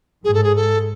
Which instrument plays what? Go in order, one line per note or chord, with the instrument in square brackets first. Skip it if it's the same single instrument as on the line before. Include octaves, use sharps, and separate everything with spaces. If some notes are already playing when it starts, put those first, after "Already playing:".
[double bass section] G#2 [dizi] G#4
[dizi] A4
G#4
A4